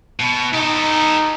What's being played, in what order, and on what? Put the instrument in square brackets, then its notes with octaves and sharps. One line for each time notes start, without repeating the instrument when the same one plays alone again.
[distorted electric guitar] B2
[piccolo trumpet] D#4 [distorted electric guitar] G4 A4